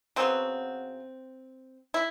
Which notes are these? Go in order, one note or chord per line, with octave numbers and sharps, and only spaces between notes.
C#3 F#3 B3 C4
E4